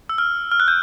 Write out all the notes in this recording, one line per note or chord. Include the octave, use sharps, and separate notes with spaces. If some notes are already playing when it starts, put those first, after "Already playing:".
E6
F6
F6
F#6
G6